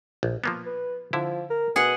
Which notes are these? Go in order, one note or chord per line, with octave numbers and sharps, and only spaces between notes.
A#1
F3 A#3 B3
B4
D3 F3 E4
A#4
B2 G#4 F#5